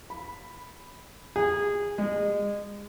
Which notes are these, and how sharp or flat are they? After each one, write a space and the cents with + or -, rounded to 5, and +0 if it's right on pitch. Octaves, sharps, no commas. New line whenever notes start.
B5 +0
G#4 -25
G#3 -30